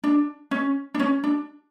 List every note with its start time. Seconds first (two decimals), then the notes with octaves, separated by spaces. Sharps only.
0.04 D4
0.51 C#4
0.94 D4
1.00 C#4
1.24 D4